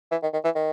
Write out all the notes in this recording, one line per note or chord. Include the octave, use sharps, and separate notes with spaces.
E3
D#3
D#3
E3
D#3